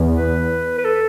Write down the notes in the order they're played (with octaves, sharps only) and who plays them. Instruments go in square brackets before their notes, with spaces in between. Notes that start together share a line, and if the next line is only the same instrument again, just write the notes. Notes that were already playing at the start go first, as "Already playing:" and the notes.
Already playing: [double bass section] E2
[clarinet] B4
B4
A4